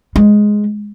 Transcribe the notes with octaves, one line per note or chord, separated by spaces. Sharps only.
G#3